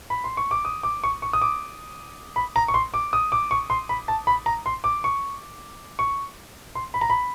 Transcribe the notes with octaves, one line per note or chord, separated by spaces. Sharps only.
B5
C6
C#6
D6
D#6
D6
C#6
C#6
D#6
D6
B5
A#5
C#6
C6
D6
D#6
D6
C#6
C6
B5
A5
B5
A#5
C6
D6
C#6
C#6
C6
B5
A#5
B5